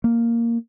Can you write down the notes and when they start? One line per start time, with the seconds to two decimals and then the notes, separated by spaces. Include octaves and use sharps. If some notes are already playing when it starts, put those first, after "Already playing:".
0.04 A#3